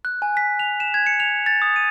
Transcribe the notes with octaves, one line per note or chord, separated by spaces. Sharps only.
F#6
G#5
B6
F7
E7
G#6
C#7
F7
A6
D#6
D#7